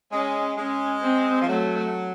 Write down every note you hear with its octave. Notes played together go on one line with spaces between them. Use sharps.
G#3 C#4
G#3 C#4
C4
F3
F#3 A3